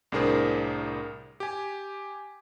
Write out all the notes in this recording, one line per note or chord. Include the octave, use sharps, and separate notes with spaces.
C2 A2 D4 G#4 A#4 C5
G4 G#5